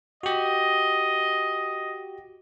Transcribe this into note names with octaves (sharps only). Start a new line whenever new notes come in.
F#4 G4 D#5